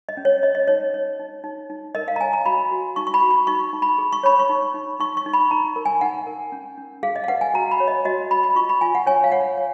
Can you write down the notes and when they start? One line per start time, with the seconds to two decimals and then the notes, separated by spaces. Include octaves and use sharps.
0.09 D#5
0.17 C#4
0.25 C#5
0.43 C#5 D#5
0.55 D#5
0.67 D#4 C#5
0.94 C#5
1.19 D#4
1.44 D#4
1.70 D#4
1.95 A#4 D#5
2.08 F5
2.16 A#5
2.21 C#5 G#5
2.33 A#5
2.46 F#4 B5
2.71 F#4
2.96 D#4 C#6
3.07 C#6
3.14 B5
3.22 F#4
3.31 B5
3.47 D#4 C#6
3.73 D#4
3.82 B5
3.98 G#4
4.13 C#6
4.23 C#5 B5
4.39 C#6
4.49 D#4
4.74 D#4
5.00 D#4 C#6
5.17 C#6
5.26 D#4
5.33 B5
5.51 D#4 A#5
5.76 A#4
5.85 G#5
6.01 D#4 F#5
6.27 A#4
6.52 C#4
6.77 C#4
7.03 G#4 F5
7.16 D#5
7.24 F5
7.28 B4 F#5
7.41 G#5
7.54 F#4 A#5
7.71 B5
7.80 C#5
7.88 D#5
8.05 F#4 D#5
8.30 F#4 B5
8.44 B5
8.55 F4 C#6
8.69 B5
8.81 F4 G#5
8.95 F#5
9.06 C#5 G#5
9.24 F5
9.32 C#5 F#5
9.57 C#5